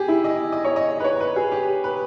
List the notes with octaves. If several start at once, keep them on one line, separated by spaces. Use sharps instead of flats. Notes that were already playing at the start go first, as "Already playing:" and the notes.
Already playing: G4 G#4
E4
D#5
D#5
C#5
D#5
B4
C#5
B4
G#4
G4
B4